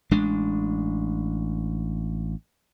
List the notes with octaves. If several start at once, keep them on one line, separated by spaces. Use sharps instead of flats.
A1 G#3 D4